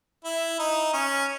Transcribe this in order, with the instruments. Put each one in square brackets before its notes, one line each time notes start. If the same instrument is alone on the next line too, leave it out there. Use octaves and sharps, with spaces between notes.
[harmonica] E4
D#4
C#4